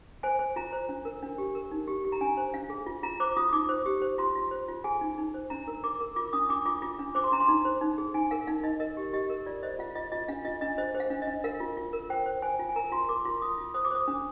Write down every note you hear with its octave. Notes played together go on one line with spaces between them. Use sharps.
C5 G#5
C5
F4 A#5
C5
D4
A#4
D4
G4
A#4
D#4
G4
G4
A#5
D4 G#5
C5
D4 F5
G#4
F4
F4 A#5
C5 D6
F4 D#6
D#4 D6
C5
G4
C5
F4 C6
F4
C5
F4
G#4 G#5
D#4
D#4
C5
D4 A#5
A#4
A#4 D6
A#4
F4 D6
D4 D#6
D4 D6
F4 D6
F4 D6
D4
C5 D6
C6
D4 A#5
C6
D#4
C5
D#4
G#4
D#4 G#5
A#4 F5
D#4 F5
D#4 D#5
A#4 D#5
G4
G4 D#5
A#4
F4 D5
C5 D#5
F4 F5
F4 D#5
F4 D#5
D4 F5
F4 D#5
D4 D#5
C5 D#5
C5
F5
D4
D#5
D4
A#4 F5
F4
F4
A#4
C5 G5
C5
C5 G#5
F4
G#5
A#4 A#5
F4 C6
A#4 D6
F4 C6
F4 D#6
F4
C5 D#6
D6
C5 D#6
D4